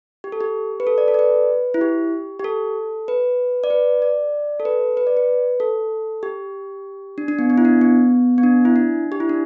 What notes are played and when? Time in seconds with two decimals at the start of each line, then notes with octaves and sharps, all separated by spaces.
0.24 G4
0.32 A4
0.41 G4
0.80 B4
0.87 A4
0.98 D5
1.08 A4
1.14 D5
1.19 B4
1.74 E4
1.81 G4
2.39 G4
2.44 A4
3.08 B4
3.64 D5
3.70 B4
4.02 D5
4.60 A4
4.65 B4
4.97 B4
5.07 D5
5.17 B4
5.60 A4
6.23 G4
7.18 D4
7.28 D4
7.39 B3
7.50 B3
7.58 E4
7.65 D4
7.81 B3
8.38 B3
8.43 D4
8.65 E4
8.76 D4
9.12 G4
9.20 E4
9.29 D4